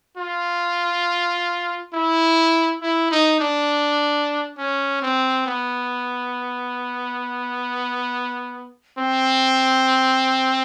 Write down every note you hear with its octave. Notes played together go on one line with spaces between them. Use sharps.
F4
E4
E4
D#4
D4
C#4
C4
B3
C4